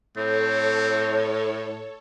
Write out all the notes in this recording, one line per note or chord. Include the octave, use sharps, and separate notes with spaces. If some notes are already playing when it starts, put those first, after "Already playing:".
A2 C4 A4 C#5